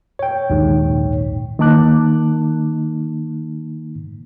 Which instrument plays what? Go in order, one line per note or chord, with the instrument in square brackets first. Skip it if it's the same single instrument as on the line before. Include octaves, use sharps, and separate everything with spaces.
[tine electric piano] C#5 G5
[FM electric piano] A#1 D#2 G#2
[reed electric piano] D#3 A#3 D#4 A5 D6 F#6